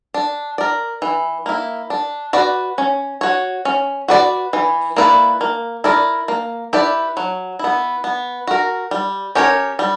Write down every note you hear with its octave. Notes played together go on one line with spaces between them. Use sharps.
D4
A#4 D5
E3
A#3 E4
D4
F#4 B4 D5
C#4
F#4 C#5
C#4
F#4 B4 D5
E3
A#3 E4 B4 D5
A#3
E4 A#4 D5
A#3
E4 G4 B4 D5
F#3
B3 E4
B3
F#4 A#4
G3
C#4 G4 A#4 C#5
G3